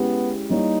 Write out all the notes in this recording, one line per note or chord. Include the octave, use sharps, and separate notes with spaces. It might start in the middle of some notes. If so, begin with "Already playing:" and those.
Already playing: G#3 B3 C#4 E4 G4
G3 A#3 D#4 E4 G4 C#5